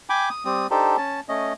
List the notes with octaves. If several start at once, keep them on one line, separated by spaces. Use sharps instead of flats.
G5 G#5 B5 D6
D#6
G3 C4 D#6
D4 D#4 G4 A4 C5
C#4 A5
A3 C#4 D#5